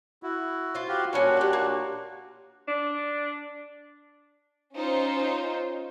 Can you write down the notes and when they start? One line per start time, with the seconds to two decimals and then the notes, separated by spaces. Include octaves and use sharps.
0.23 E4 F#4
0.75 F4 C5
0.88 F#4 G4 F5
1.13 A#2 E3 G3 C#4 D4 F#4
1.37 G4 F#5
1.53 A#3
2.68 D4
4.75 C#4 D#4 F4 C5